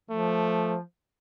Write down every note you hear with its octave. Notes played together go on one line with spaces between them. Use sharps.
F3 A3